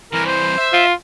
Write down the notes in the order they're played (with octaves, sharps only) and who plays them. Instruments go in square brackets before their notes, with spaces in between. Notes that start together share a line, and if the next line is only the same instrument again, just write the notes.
[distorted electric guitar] C2 E3 [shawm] A#4
[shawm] C5
[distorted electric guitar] E5
[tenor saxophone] F4